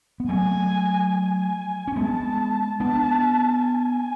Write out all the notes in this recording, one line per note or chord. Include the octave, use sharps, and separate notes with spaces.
B3
F#3 A3 G#5
G#5
C#4
G#3 B3 A5
B3 D4 A5
G#5